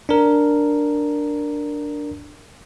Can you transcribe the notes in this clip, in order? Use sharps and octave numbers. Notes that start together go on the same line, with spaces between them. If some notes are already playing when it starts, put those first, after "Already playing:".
D4 A#4